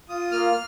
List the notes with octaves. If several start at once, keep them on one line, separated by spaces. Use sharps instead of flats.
F4 D#6
A#3 F6